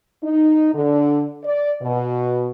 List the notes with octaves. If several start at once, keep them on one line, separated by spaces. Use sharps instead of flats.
D#4
D3
D5
B2